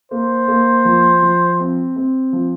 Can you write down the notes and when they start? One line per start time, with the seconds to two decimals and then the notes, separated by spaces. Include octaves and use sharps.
0.11 A#3 C5
0.48 A#3
0.85 F3
1.22 F3
1.59 C4
1.96 C4
2.33 F3